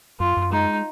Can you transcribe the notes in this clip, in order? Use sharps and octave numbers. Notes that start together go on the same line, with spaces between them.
F#2 F4
F#2
G#3 D#4